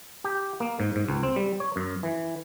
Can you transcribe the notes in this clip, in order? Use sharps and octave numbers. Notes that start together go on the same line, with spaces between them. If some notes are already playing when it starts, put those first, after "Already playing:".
G4
A#3
G#2
G#2
C#2
C4
G3
C#5
F#2
E3